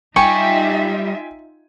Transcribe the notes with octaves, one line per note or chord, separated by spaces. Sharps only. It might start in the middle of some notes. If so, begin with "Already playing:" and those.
G3 D#4 F4 G4 E5 G5 G#5 C#6